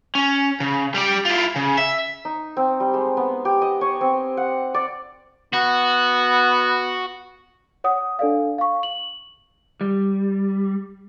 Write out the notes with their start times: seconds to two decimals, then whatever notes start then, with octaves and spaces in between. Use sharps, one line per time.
0.15 C#4
0.60 C#3
0.95 G3 D5
1.25 E4 F4
1.56 C#3
1.77 E5
2.25 D#4
2.57 C4
2.80 G3
2.94 G#3
3.17 B3
3.45 G4
3.62 D#5
3.81 C#5
4.01 C4
4.37 F#5
4.74 D5
5.54 B3 F#4
7.84 C#5 F#5 D#6
8.19 D4 A4 D5 F5
8.58 F5 C#6
8.83 F#7
9.81 G3